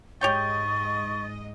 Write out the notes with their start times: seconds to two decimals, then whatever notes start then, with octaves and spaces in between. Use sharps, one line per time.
0.21 G#2 G4 C#5 D#5 G5 C#6 A6